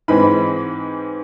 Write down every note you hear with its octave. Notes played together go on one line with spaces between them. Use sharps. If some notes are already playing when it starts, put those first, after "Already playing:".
G#2 E3 G#3 C4 B5